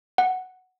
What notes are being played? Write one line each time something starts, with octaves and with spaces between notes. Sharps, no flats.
F#5